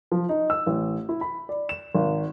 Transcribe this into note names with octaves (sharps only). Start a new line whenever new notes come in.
F3
D#4
E6
A1
E4
B5
D5
E7
G#1